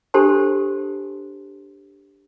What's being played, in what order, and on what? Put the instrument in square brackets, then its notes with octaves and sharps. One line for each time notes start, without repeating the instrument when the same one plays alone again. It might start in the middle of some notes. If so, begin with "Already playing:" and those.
[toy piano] D4 G4 A4 C5 A5 C6